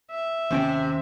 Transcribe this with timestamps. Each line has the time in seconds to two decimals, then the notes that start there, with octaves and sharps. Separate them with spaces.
0.11 E5
0.51 D#2 C3 C#4 G5